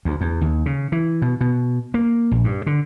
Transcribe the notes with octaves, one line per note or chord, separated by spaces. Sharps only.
D2
E2
D#2
C#3
E3
B2
B2
A#3
A#1
G2
D3